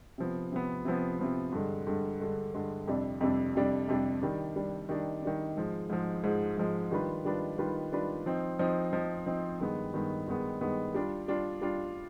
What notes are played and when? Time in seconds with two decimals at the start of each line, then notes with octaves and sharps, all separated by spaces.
0.18 C3 F3 B3
0.52 C3 F3 B3
0.85 C3 F3 B3
1.19 C3 F3 B3
1.52 G2 D3 G#3
1.87 G2 D3 G#3
2.20 G2 D3 G#3
2.54 G2 D3 G#3
2.87 F2 C3 G3 D4
3.21 F2 C3 G3 D4
3.55 F2 C3 G3 D4
3.88 F2 C3 G3 D4
4.22 D#3 G3 D4
4.56 D#3 G3 D4
4.89 D#3 G3 D4
5.22 D#3 G3 D4
5.56 G#2 F3 G#3
5.90 G#2 F3 G#3
6.24 G#2 F3 G#3
6.57 G#2 F3 G#3
6.91 D#3 G3 D4 F4 B4
7.25 D#3 G3 D4 F4 B4
7.58 D#3 G3 D4 F4 B4
7.92 D#3 G3 D4 F4 B4
8.26 F3 C4 D#4
8.59 F3 C4 D#4
8.93 F3 C4 D#4
9.26 F3 C4 D#4
9.60 G2 D#3 G#3 B3
9.94 G2 D#3 G#3 B3
10.28 G2 D#3 G#3 B3
10.61 G2 D#3 G#3 B3
10.94 G3 D4 F4
11.28 G3 D4 F4
11.62 G3 D4 F4